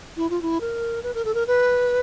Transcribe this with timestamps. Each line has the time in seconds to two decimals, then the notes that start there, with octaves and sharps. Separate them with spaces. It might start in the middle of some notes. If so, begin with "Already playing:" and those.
0.17 E4
0.30 F4
0.42 E4
0.61 A#4
1.03 B4
1.15 A#4
1.25 A4
1.34 A#4
1.47 B4